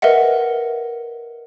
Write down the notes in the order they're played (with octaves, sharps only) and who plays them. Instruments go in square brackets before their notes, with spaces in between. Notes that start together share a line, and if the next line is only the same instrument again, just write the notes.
[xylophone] A#4 B4 D#5 E5 F#5